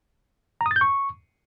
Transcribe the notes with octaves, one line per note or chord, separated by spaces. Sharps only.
A#5
D#6
A6
G6
C#6